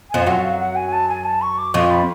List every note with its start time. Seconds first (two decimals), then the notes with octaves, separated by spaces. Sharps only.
0.10 F2 F3 G#5
0.21 F5
0.26 F#2 F#3 F#5
0.44 F5
0.59 F#5
0.76 G#5
0.93 A5
1.09 G#5
1.25 A5
1.42 C#6
1.58 D6
1.74 F2 F3 C#6
1.91 B5